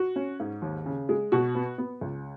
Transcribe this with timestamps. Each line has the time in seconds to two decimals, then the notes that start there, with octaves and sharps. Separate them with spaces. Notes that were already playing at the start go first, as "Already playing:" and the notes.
Already playing: F#4
0.16 C#4
0.40 G#2
0.62 D#2
0.86 C#3
1.09 G#3
1.32 B2 F#4
1.55 B3
1.78 B3
2.01 C#2